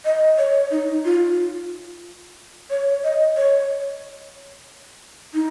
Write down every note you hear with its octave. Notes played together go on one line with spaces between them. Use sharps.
D#5
C#5
D#4
F4
C#5
D#5
C#5
D#4